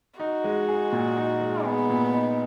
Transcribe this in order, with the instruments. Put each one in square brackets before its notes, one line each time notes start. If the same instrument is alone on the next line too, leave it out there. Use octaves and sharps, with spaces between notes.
[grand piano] D#4 [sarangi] F#4
[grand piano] G#3
G#4
A#2
D#4
G#3
[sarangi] B3 [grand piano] G#4
[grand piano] A#2
D#4